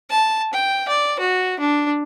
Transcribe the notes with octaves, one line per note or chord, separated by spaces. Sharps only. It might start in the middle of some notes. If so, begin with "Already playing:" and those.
A5
G5
D5
F#4
D4